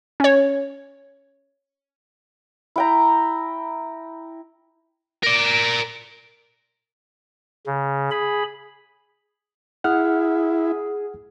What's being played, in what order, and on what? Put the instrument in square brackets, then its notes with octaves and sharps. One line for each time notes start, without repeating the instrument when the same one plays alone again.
[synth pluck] C#4 C#5
[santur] E4 G5 A#5
[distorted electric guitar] A#4 D5
[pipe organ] C#3
G#4 B5
[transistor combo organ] E4 [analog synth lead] G#4 [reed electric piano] F#5 F6